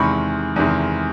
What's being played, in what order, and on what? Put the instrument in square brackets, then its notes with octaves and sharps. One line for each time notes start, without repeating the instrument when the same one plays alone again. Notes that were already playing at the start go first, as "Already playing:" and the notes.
Already playing: [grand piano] E2 C3 D#3 G#3 B5 C#6
E2 C3 D#3 G#3